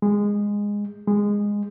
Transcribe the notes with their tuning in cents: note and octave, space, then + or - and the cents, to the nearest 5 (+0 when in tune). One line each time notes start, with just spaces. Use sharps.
G#3 -15
G#3 -15